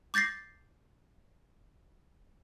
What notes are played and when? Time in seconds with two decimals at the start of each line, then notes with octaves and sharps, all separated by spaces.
0.14 D6 G6 A6 A#6 C7